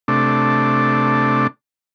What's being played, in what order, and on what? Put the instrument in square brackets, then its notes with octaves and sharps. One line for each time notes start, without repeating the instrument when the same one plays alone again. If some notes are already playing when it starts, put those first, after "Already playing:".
[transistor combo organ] C3 A3 D4